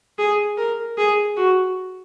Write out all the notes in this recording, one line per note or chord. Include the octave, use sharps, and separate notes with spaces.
G#4
A#4
G#4
F#4